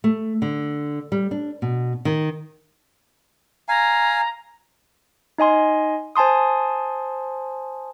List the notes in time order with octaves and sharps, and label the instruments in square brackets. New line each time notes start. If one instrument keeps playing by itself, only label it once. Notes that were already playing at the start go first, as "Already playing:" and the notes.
[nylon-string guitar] A3
D3
G3
D4
B2
D#3
[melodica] F5 G#5 [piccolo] A#5
[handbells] D#4 D#5 G#5 C6
C5 G#5 A5 C6 D#6